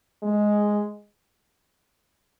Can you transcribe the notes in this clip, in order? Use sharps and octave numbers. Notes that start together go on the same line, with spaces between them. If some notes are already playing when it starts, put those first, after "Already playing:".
G#3